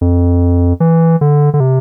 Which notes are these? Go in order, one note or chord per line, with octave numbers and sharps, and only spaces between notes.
F2
E3
D3
D3
C3